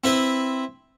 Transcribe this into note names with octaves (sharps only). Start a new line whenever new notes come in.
C4 E4 B4